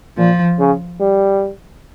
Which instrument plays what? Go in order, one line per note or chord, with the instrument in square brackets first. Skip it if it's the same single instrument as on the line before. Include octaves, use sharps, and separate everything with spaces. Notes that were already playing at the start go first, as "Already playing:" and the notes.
[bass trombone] A#2 [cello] F3
[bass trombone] C#3
G3